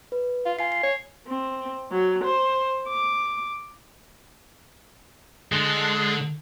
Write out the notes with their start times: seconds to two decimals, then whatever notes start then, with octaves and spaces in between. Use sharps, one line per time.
0.12 B4
0.46 F4
0.59 F4 G#5 C7
0.72 C7
0.84 C#5
1.27 C4
1.91 F#3
2.24 C5
2.88 D6
5.52 D3 G#3 A5 C6 F#6